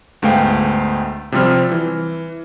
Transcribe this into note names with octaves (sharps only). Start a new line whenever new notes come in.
D2 G#2 A3 B3 F5 G5
C3 F3 G3 C4 F6
E3